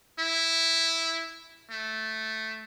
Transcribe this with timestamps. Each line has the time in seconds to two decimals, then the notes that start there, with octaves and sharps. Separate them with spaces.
0.19 E4
1.71 A3